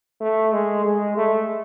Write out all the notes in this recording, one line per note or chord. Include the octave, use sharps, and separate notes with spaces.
A3
G#3
G#3
A3